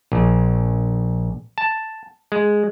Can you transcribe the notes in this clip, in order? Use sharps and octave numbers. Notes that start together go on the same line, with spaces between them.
A#1
A5
G#3